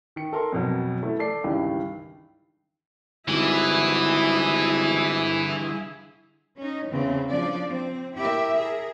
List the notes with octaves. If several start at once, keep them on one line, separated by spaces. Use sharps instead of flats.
D#3 C#7
A4 A#4 C6
F2 B2 F#3
E3 A3
A4 D5 C7
C#2 G2 D#3 E3
G#1 D3 E3 G3 E4 G#4
C#4 D#4
E2 C#3 E3 C4
F3 D4 D5
C4
E4 G4 A#4 E5
G#4 A#4